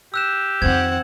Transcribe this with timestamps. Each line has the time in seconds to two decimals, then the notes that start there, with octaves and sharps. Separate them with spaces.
0.14 G4 E6 F#6 E7
0.62 F2 D#3 C4 F#5 G#6